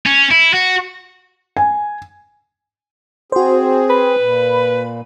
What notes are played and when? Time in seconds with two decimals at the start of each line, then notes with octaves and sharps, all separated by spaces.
0.06 C#4
0.31 E4
0.53 F#4
1.57 G#5
3.32 C4 F#4 G#4 C5
3.90 B4 B5
4.20 A#2